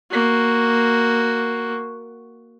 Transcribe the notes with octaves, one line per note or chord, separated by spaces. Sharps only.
A#3 F#4